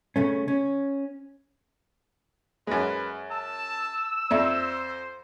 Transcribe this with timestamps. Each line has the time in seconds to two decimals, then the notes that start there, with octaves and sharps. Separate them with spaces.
0.16 C#3 A3 C#4
0.48 C#4
2.67 F#2 G#3 B4
3.31 A5 E6
4.31 F2 C5 D5 E5